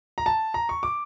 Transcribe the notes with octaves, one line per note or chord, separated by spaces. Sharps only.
A#5
A5
A#5
C#6
D6